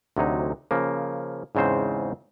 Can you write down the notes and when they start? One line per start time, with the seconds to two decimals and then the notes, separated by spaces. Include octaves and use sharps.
0.17 D2 C3 F#3 D#4
0.71 C#3 F3 A#3
1.55 E2 G#2 C#3 C4 C5